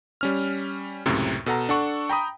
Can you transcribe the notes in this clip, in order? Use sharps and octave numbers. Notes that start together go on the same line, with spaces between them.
G3 C#4 F6
C#2 F#2 A2 C3
B2 A4 F#5 A#5
D4 A4 F#5 C#6
G5 A#5 B5 D#6